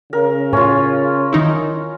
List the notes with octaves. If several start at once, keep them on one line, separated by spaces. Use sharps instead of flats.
C#3 A#4
A2 C#4 F4
D#3 D#4 E4